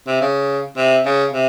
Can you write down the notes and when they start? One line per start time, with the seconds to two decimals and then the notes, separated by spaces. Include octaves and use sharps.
0.07 C3
0.21 C#3
0.77 C3
1.06 C#3
1.33 C3